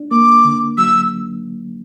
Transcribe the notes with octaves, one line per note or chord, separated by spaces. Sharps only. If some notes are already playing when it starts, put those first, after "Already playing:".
Already playing: D4
A#3 D6
D3
F#3 E6